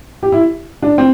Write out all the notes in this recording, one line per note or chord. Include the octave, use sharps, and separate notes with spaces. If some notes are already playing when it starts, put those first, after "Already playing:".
G4
E4
D4
C4